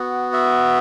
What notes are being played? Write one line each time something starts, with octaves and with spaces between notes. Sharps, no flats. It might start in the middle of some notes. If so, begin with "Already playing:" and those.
Already playing: B3 F#4
E5